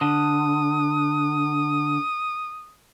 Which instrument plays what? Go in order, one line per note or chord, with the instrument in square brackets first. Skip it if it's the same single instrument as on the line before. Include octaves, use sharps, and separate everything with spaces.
[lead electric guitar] D3 [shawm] D#6